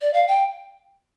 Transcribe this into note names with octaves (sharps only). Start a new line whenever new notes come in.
D5
F5
G5